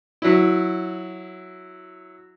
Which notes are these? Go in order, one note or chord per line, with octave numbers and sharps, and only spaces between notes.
F#3 E4